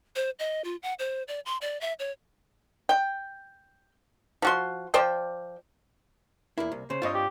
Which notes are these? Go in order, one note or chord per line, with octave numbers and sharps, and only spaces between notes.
C5
D#5
F4
F#5
C5
D5
C6
D5
E5
C#5
G5
F3 F#4 C6
F3 C5 D5 G5
E2 A#3 E4
C2
C#3 C5
G2 C4 F4 C#5 D#5
G4